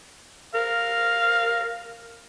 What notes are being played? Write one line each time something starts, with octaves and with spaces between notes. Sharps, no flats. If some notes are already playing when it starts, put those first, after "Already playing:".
A#4 F5